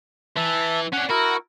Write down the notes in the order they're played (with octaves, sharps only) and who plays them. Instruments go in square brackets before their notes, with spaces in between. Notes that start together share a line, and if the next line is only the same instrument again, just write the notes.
[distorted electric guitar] E3 [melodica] E5 A5
[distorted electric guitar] C#4 D4 [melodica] F#5
[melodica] E4 A#4 [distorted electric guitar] F#4